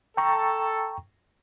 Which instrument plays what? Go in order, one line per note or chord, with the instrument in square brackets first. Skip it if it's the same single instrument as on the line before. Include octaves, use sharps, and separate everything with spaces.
[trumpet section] A4 [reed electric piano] G5 A#5 C#6